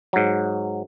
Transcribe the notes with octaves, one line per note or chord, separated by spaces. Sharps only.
G#2 F#3